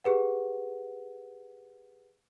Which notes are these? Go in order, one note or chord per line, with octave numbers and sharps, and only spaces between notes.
G4 G#4 B4 F#5